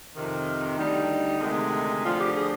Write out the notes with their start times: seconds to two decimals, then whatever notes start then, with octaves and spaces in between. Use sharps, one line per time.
0.15 F2 C3 D#3
0.77 D2 D3 G3 D#4
1.40 D2 C3 D#3 G#3
2.03 D2 D3 F3 F4
2.19 G4
2.34 G#4